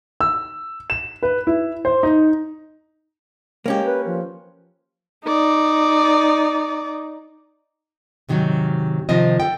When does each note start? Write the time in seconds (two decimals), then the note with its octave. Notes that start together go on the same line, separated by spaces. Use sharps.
0.21 E6
0.90 E7
1.23 B4
1.47 E4
1.85 C5
2.03 D#4
3.66 G#3 A#3 C#4 G4
3.84 B4
4.06 F3
5.25 D#4 D5
8.29 G#2 C3 D#3 F3 F#3
9.09 C3 D#3 F3 C4 D#5
9.40 A4 G5